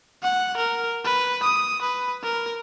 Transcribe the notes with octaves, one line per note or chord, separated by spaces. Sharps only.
F#5
A#4
B4
D#6
B4
A#4